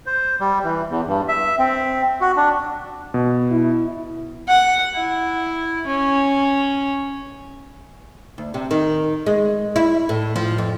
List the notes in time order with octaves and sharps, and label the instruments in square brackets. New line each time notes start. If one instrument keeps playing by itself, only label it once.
[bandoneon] C5
G3
E3
E2
G2
E5
C4
F#4
D4
[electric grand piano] B2
[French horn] E4
[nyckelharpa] F#5
E4
C#4
[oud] D2
C3
D#3
G#3
E4
A2
F3
F2